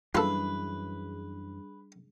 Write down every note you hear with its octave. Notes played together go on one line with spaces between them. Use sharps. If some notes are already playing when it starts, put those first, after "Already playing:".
F#2 E3 G3 D4 F4 G#4 A4 B4